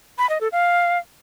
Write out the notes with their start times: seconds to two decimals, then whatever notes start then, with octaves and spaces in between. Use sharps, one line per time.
0.18 B5
0.30 D#5
0.41 A4
0.52 F5